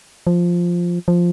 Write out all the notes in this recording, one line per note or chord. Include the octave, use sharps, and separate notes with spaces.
F3
F3